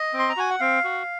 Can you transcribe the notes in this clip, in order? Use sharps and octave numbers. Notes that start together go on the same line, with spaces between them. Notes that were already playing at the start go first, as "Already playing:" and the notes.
Already playing: D#5
C4
C6
A#5
F#4 G#5
F#5
C4 F5
F#4